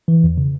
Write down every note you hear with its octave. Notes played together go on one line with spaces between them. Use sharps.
E3
E2
C#3